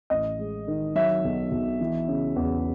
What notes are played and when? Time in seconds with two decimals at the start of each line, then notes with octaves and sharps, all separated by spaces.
0.10 A1 D#5
0.39 G#3
0.67 D#3
0.95 F#3 E5
1.24 B1
1.51 B1
1.81 E3
2.08 C#3
2.36 E2